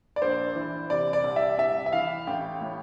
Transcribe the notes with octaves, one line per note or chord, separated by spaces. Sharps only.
D5
A#1 C5
E3
C3 D5
D5
C2
E5
C2 E5
E5
E3 F5
A1 G5
A2